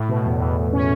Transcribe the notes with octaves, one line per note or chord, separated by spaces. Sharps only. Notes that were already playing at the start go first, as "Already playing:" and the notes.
Already playing: A2
B2
E2
E2
E2
C#4